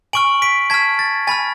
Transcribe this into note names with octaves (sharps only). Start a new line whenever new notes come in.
G#5 C#6 F6 D7 F#7
B6 D7
A5 F6 G#6 B6
A6
G#5 B5 F6 A6